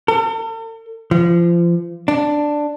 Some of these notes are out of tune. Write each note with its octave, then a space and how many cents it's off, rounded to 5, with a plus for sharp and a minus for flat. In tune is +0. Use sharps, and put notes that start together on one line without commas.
A4 +45
F3 -30
D4 +5